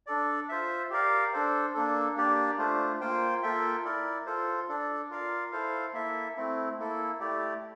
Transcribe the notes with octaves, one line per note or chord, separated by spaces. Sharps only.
D4 A4 D5
F4 C5 E5
G4 A#4 D5 F5
D4 A4 C5
A#3 D4 A4
A#3 D4 G4 D5
A3 D4 F4 C5
A#3 F4 C5 G5
A#3 F4 A4 E5 G5
E4 A#4 D5
F4 A4 C5
D4 A4 D5
F4 A#4 D5 F5
E4 A4 C5 F5
A#3 E4 A4 E5
A3 C4 E4
A#3 E4 A4
A3 E4 G4 D5